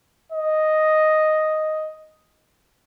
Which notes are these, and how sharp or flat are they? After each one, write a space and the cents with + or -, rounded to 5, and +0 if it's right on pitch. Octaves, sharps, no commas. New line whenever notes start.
D#5 +0